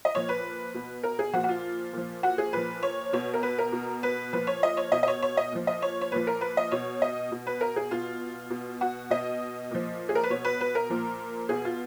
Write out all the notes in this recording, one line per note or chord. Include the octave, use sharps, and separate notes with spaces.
D#5
A#2 F3 C#5
B4
B2
A#4
G#4
A#2 F3 F#4
F#4
F4
A#2 F3
F#4
G#4
A#2 F3 B4
C#5
B2 C#5
A#4
B4
A#4
B2
B4
A#2 F3 B4
C#5
D#5
C#5
B2 D#5
D#5
C#5
C#5
D#5
A#2 F3
D#5
C#5
C#5
A#2 F3 B4
A#4
B4
D#5
B2 C#5
D#5
B2
B4
A#4
G#4
B2 F4
B2
F#4
B2 D#5
A#2 F3
G#4
A#4
B4
B2 C#5
B4
B4
A#4
A#2 F3
B2 G#4
F4